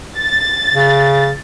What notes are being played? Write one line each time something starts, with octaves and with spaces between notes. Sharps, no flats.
A6
C#3